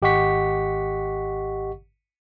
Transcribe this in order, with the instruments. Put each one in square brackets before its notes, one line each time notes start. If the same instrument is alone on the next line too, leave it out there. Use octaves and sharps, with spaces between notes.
[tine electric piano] G#1 G4 D#5 F#5 C#6 B6